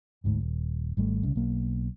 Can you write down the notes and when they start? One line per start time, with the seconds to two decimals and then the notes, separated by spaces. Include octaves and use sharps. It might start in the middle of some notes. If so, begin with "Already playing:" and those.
0.24 G1 D2 G#2
0.41 D#1
0.97 G#1 G3 A3
1.23 C2 C#3
1.36 B1 A#3